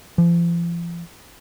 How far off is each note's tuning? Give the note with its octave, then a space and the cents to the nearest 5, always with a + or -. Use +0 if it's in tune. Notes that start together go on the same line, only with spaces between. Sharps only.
F3 -40